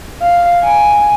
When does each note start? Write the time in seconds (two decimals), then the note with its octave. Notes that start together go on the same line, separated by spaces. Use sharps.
0.22 F5
0.64 G#5